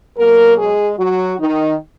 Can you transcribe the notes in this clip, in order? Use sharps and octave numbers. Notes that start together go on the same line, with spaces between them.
B2 F#3 A#3 A#4
G#3 G#4
F#3 F#4
D#3 D#4